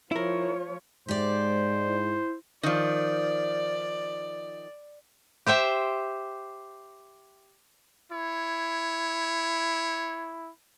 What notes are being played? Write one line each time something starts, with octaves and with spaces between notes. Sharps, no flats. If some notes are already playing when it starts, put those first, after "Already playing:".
F3 E4 F4 A#4 C#5
G#2 G#3 G4 C5 D5
E4
D#3 F3 D5
G4 C5 E5 G5
E4 C#5